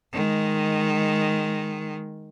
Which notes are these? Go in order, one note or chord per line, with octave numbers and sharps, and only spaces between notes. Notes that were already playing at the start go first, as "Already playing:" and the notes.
D#3 G#3